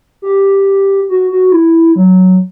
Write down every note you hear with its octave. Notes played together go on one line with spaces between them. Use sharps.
G4
F#4
F#4
E4
F#3